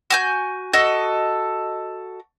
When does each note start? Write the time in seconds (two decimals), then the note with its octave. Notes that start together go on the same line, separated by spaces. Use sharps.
0.10 F#4 G#5 G6
0.73 F#4 A4 D#5